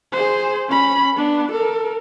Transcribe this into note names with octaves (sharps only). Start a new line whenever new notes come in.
G#4 C5
C#4 B5
B3 D4
A4 A#4